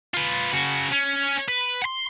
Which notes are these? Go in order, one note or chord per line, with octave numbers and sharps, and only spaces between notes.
F4 B4
C#3 F#4
C#4
B4
F#5 C6